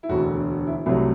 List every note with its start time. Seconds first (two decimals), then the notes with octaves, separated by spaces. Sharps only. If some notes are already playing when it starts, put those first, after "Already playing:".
0.03 E4
0.09 E1 D2 D3 F#4
0.67 E4
0.86 C2 C3 F#3 A3 E4